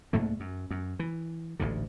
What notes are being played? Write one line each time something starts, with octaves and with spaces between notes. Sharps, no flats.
C2 G#2 A3 A#3
F#2
F#2
E3
A1 D2 G#2 D3